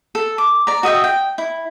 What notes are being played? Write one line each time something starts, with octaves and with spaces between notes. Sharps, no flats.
A4
D6
D5 A#5
F#4 D#5 E5 G5
G5
E4